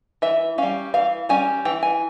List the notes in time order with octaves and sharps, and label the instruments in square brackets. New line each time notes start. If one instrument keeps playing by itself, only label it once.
[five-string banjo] E3 E5
G3 C#4 F5
E3 F5
G3 C#4 G#5
E3 G5
G#5